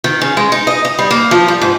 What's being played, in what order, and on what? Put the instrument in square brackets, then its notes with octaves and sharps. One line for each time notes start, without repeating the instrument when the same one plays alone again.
[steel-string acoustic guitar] D#3
C#3
G#3
D#4
D#5
D#5
G3
A#3
F3
G3
G#2